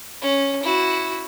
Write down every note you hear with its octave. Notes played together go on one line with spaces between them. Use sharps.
C#4
E4 F#4